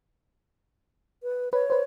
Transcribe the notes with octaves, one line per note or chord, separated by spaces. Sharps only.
B4
B4 C#5
B4 C5